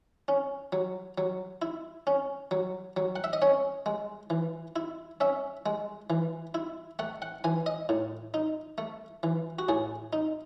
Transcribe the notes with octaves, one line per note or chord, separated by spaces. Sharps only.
C#4
F#3
F#3
E4
C#4
F#3
F#3
F#5
E5
D#5
C#4 C#5
G#3
E3
E4
C#4 E5
G#3
E3
E4
A3 F#5
F#5
E3 G#5
D#5
A2
D#4
A3
E3
F#4
A2 G#4
D#4